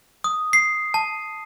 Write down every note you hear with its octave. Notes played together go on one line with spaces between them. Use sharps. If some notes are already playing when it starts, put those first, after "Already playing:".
D#6
C7
A5